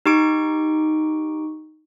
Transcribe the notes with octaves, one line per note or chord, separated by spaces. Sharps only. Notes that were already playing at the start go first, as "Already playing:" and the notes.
D#4 G4 C#6 D7